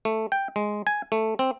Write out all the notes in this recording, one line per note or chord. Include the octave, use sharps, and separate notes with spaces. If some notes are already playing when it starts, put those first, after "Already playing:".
A3
G5
G#3
G#5
A3
C4